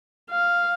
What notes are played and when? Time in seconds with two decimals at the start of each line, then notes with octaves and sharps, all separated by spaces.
0.30 F5